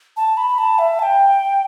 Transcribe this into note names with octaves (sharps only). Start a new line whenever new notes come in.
A5
B5
A5
E5
A5
G5